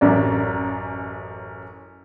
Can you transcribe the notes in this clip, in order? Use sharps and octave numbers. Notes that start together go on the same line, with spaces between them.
A1 F#2 D5